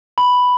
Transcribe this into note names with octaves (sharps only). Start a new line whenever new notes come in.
B5